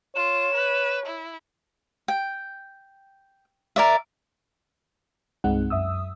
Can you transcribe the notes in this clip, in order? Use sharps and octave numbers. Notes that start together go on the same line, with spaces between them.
F4 C#5 E7
B4
E4
G5
A#4 D5 E5
C2 G2 G#3 C4 D#4 F#5
F#2 E5 D#6 E6